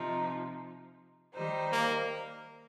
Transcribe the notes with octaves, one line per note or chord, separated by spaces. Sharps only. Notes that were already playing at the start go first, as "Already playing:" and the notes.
Already playing: C3 F3 D#4
D#3 G3 D#4 C5
A#3